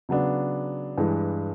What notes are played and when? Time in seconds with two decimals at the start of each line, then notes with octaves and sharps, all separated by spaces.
0.09 C#3 F#3 B3 D4
0.98 G2 E3 G#3